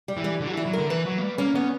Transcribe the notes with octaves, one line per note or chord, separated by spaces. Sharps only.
G3
E3
G3
D3
F#3
E3
E4
F#3
D3 A#4
E3 B4
F#3
A#3
G3
A#3 C#4
B3 C#4